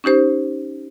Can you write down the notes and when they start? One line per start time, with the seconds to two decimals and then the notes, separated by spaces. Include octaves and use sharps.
0.04 C#4 D#4 G4 C5